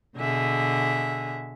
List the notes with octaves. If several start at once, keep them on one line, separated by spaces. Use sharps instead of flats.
B2 D3 G#4 E5